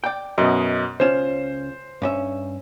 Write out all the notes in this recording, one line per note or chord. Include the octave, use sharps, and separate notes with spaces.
D5 G5
F#2 B2 D#5
C#2 C#4 F4 C5 E7
G2 C#4 E5